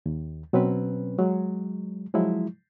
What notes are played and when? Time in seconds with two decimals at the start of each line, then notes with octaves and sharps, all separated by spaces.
0.06 D#2
0.53 B2 F#3 C4 C#4 B4
1.19 F#3 G#3
2.14 F3 F#3 G#3 E4